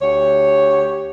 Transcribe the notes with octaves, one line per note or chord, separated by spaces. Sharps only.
D2 G4 C#5